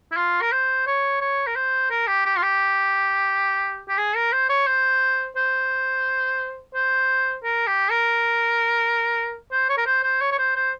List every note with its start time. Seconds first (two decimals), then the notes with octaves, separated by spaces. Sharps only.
0.12 E4
0.17 F4
0.41 A#4
0.52 C5
0.87 C#5
1.21 C#5
1.47 A#4
1.56 C5
1.90 A#4
2.07 G4
2.26 G4
2.37 F4
2.42 G4
3.89 G4
3.98 G#4
4.16 A#4
4.33 C5
4.49 C#5
4.67 C5
5.37 C5
6.75 C5
7.44 A#4
7.67 G4
7.91 A#4
9.52 C5
9.69 C#5
9.78 A#4
9.86 C5
10.04 C5
10.21 C#5
10.32 C#5
10.39 C5
10.56 C5